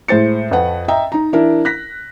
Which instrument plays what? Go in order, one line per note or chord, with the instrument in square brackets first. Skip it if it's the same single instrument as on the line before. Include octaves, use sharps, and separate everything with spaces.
[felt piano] A2 G#3 C5 A6 C#7
F2 F3 B4 F#5
D#5 E5 G5 A#5
D#4 A#5
E3 D4 E4 A#4
F#6 A#6 B6